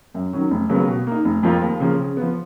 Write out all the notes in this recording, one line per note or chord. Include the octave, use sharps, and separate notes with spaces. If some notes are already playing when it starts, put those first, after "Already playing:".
F#2
D#3 F#3 C#4
F1
D#2 C#3 F#3 B3
B2
A#3 D#4
F1
F2 F3 A#3 F4
D#2
C#3 F3 A#3
C#3
F3 B3